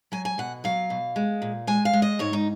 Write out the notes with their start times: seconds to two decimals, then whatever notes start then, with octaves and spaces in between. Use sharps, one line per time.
0.12 F#3 G#5
0.25 G#5
0.38 B2 F#5
0.64 F#3 F5
0.90 B2
1.16 G#3
1.42 A#2
1.67 G#3 G#5
1.85 F5
1.93 G#3
2.02 D#5
2.19 G#2 C#5
2.33 D#4